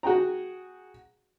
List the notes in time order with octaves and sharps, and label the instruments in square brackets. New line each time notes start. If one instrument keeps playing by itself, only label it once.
[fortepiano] F#4 G#4 G5 A#5